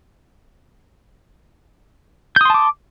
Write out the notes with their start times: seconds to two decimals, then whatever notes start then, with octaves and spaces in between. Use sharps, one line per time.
2.36 G6
2.41 D#6
2.45 C6
2.50 A5
2.54 D6